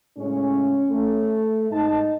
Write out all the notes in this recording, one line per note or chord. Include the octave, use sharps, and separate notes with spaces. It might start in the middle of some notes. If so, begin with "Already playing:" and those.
A2 C#3 G#3 C#4
A3
G#2 D#4 A5